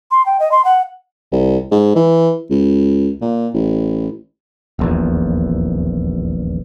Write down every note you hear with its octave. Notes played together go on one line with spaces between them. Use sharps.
C6
G5
D#5
C6
F#5
C2
G#2
E3
C#2
A#2
A1
D#1 A#1 E2